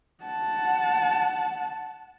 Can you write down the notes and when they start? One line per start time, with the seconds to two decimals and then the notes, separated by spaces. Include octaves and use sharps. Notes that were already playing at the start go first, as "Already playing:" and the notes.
0.24 F#5 A5